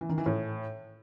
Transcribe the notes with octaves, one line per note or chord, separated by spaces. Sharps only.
E3
D#3
E3
A2